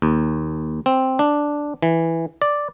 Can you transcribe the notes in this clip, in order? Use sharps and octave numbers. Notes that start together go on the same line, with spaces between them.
D#2
C4
D4
E3
D5